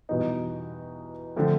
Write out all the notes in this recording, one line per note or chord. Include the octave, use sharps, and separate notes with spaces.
E2 B2 G3 B3 D#4
D3 F3 A3 C4